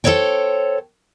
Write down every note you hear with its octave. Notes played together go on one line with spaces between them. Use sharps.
A4 A#4 C5 C#5 G5